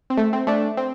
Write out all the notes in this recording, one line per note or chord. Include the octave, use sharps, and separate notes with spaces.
C4
A3
C4
A3 D4
C4